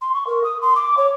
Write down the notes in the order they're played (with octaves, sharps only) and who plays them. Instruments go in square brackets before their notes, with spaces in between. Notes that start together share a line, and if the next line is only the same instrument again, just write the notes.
[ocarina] C6
C#6
A#4
D#6
C6
D6
C#5